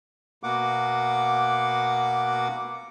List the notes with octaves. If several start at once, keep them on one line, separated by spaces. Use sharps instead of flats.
B2 A#3 F#5 D6